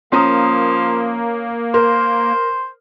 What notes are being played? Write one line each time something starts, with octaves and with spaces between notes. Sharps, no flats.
F3 A#3 C#4 A#5 D#6
A#4 C5